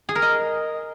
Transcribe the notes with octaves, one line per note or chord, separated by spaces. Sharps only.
G#4
A#4
D#5